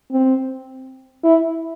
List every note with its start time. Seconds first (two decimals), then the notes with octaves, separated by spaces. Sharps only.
0.12 C4
1.24 E4